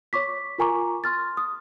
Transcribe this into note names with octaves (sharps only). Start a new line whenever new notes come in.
C#5 C#6 D6 B6
F4 A#4 G#5 A#5 C#6 D6
C6 F6 A6
D#6